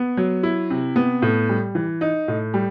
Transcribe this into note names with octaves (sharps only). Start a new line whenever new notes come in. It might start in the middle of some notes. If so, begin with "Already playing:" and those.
Already playing: B3
F#3
E4
C3
B3
A2
G3
E3
D#4
A2
G3